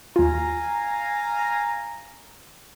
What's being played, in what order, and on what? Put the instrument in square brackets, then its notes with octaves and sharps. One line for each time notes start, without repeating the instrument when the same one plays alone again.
[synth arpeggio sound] D#2 F4 [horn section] F5 G#5 A#5